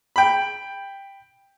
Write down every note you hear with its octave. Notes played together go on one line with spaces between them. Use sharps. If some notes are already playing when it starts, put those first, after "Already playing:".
G5 B5